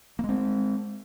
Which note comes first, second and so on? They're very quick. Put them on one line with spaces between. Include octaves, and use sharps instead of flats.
A#3 G#3 C4